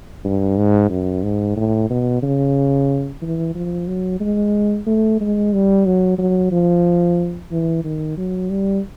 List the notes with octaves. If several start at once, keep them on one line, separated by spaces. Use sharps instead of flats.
G2
G#2
F#2
G#2
A2
B2
C#3
E3
F3
F#3
G#3
A3
G#3
G3
F#3
F#3
F3
E3
D#3
F#3
G3